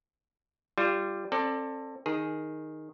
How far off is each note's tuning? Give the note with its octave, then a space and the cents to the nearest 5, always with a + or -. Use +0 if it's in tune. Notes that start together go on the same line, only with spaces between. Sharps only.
G3 +0 F4 -20
C4 +35 A4 +20 D5 +15
D#3 +0 G#4 +0